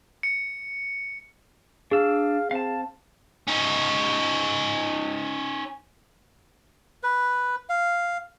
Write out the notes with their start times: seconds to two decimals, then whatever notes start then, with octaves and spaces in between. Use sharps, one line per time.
0.23 C#7
1.91 D4 G#4 F5 E6
2.51 C4 F5 A5
3.48 C#4 D#4
7.03 B4
7.69 F5